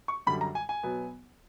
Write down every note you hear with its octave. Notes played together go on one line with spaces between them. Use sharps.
C#6
F#2 D3 G3 B5
A#5
G#5
G#5
B2 F#3 B3